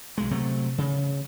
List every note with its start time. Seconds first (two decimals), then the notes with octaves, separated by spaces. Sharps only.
0.18 B1 G#3
0.31 C3 F#3 A3
0.78 C#3